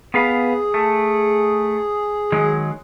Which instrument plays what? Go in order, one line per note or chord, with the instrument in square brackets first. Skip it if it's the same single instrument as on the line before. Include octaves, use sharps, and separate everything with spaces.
[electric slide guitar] B3 B4 F5 [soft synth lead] G#4
[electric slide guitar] A3
D#3 F#3 G#3